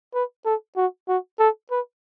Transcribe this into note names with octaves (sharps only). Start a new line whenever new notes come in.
B4
A4
F#4
F#4
A4
B4